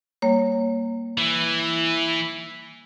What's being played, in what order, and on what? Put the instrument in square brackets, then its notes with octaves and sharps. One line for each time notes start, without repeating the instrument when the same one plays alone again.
[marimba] G3 A#3 C#5
[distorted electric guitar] E3